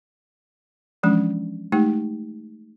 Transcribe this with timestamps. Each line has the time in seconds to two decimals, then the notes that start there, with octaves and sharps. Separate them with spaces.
1.03 E3 F3 G#3 C#4 D4
1.72 G#3 A3 D#4 G4